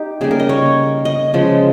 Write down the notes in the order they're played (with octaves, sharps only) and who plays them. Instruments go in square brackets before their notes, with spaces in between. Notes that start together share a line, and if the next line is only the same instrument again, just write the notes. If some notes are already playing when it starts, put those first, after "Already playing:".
Already playing: [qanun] D#4 G4
C#3 G3 A#3 G#4
A#4
D#5
C#5
D#5
C#3 F3 G#3